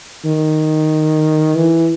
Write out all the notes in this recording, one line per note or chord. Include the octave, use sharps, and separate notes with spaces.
D#3
E3